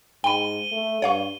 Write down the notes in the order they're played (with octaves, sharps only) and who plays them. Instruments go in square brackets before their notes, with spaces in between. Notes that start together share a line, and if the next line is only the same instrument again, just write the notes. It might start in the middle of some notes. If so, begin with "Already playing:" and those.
[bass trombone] G#2 [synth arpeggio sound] G5 B5 [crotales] D#7 G7
[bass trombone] A3
[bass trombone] G2 [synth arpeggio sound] C#5 F5 C#6